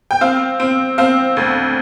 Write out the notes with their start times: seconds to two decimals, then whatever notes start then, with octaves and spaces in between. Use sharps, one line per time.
0.11 G5
0.21 C4 F5
0.60 C4
0.98 C4 F5
1.37 D2